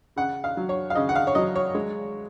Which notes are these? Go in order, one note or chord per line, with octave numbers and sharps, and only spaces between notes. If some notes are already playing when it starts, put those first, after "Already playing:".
C#3 F#5
F5
F#3
C#5
F5
C#3 D#5
F#5
F5
C#5
F#3 D#5
C#5
G#3